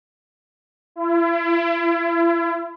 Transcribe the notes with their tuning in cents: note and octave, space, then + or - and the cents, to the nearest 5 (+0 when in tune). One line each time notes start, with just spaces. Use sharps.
E4 +40